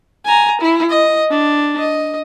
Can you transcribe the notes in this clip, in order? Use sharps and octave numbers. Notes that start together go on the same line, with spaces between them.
G#5 A#5
E4
D#5
D4
D#5